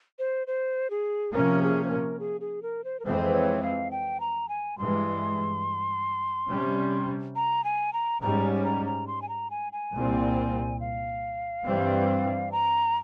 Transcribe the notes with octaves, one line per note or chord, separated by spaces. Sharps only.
C5
C5
G#4
C3 F3 A#3 C#4 A#4
G#4
C5
A#4
G#4
G#4
A#4
C5
A#4
F2 E3 G#3 C4 C5
C#5
F5
G5
A#5
G#5
G2 E3 G#3 C6
C3 G3 C#4
A#5
G#5
A#5
G#2 G3 C#4 A#5
A#5
A#5
C6
G#5
A#5
G#5
G#5
C2 A#2 G3 C4
F5
G2 E3 G3 C4
A#5